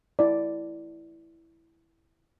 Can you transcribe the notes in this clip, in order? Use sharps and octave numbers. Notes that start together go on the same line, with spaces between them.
E4 D5